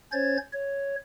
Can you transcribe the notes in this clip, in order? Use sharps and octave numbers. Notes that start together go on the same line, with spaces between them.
C#4 C5 C#5 G#6 A6
C#5